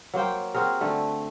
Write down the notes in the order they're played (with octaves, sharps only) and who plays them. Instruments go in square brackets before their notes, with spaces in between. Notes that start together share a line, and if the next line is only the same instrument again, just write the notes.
[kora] F#3 A#3 C5 G5
C4 F#4 G#4 A#4
D3 A3